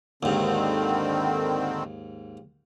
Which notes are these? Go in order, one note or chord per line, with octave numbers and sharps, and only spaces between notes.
D#2 G#2 D3 D#3 C4